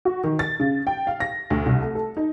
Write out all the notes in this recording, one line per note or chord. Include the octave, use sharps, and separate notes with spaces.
F#4
D#3
A6
C#3
G5
F5
A#6
D2
C2
A3
A4
D#4